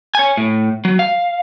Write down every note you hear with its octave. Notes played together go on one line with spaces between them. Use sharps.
C#5 G#5
A2
F#3
F5